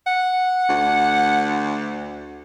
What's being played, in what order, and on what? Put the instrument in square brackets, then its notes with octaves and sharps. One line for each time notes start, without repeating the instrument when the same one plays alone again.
[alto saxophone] F#5
[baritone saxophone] D2